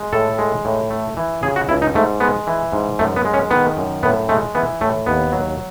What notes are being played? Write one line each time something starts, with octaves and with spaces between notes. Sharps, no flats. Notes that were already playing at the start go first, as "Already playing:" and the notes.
Already playing: G#3
A2 A4
G#3
A2
A3
E3
C#3 G#4
F#4
C#2 E4
D#4
G#2 A3
G#3 B3
E3
G#2
F#2 A3
B3
G#3
C#4
D#3 B3
F#2
A2 B3
G#3 A3
E3 B3
A2 A3
D#2 B3
F#3